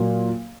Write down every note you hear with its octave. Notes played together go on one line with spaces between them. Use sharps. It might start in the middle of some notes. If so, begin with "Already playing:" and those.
Already playing: A#2 F#3 A#3